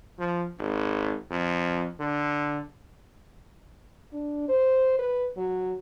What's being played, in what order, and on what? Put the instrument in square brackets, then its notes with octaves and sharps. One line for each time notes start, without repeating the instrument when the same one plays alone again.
[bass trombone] F3
G#1
F2
D3
[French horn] D4
C5
B4
F#3